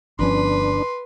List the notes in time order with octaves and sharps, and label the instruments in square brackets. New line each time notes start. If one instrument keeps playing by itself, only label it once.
[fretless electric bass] G1 F3 C#4 [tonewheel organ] D4 [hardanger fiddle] B4 [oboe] C6